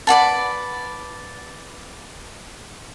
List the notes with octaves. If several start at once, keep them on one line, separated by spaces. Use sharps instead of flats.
B4 D5 F#5 A5